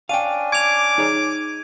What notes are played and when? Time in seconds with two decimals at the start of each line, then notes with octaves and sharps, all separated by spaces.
0.09 C#4 D4 F5 G5 D#7
0.52 D6 G#6 F7
0.98 D#4 G#4 C#5